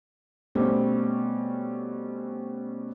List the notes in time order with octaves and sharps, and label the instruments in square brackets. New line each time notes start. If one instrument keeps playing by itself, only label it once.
[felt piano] B2 G3 A3 C4 C#4